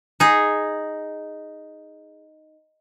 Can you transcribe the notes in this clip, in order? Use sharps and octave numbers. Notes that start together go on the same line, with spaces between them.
D#4 G#4